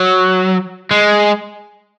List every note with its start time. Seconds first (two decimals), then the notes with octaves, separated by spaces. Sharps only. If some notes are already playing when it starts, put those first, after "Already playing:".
Already playing: F#3
0.91 G#3